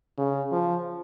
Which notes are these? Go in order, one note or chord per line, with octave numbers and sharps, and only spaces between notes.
C#3
F3